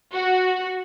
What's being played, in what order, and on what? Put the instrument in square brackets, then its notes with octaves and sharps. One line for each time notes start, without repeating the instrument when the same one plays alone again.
[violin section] F#4